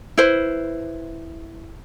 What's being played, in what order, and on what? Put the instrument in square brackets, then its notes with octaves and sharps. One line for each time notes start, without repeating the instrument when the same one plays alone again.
[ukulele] E4 B4 C5